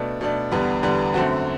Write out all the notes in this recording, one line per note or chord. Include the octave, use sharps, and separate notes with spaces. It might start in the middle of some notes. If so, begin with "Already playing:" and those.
Already playing: B2 A3 D4
B2 A3 D4
E2 D3 G3 B3
E2 D3 G3 B3
F#2 D3 A3 C4 F#4